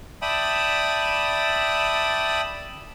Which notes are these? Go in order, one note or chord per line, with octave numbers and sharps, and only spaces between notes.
D5 E5 G5 A5 B5 D#6